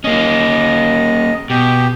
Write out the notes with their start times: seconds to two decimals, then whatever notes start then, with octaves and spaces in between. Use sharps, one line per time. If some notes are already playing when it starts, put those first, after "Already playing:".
0.04 D#2 A#3 C#4 D#5
1.50 B2 G4